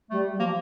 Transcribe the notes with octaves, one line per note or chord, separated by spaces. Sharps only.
G3 A3
G3
F3 A#3